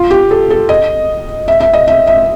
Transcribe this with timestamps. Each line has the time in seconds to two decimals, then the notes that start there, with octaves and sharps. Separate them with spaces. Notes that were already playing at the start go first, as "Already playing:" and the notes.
Already playing: F4
0.11 G4
0.31 A4
0.51 A4
0.69 D#5
1.48 E5
1.61 E5
1.74 D#5
1.88 E5
2.07 E5